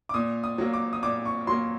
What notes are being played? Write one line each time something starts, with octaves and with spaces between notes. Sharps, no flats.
D6
A#2 D#6
D#6
F#3 A#3
D6
D#6
A#2 D6
C#6
F#3 A#3 C6